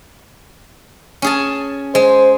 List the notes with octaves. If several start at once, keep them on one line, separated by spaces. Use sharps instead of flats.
C#4 G#4 A5
G#3 C5